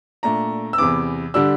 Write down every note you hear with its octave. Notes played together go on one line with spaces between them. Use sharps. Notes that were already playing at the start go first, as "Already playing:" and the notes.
A#2 A3 D4 A#5
E6
E2 C3 E3 D6
D3 G3 D4 E6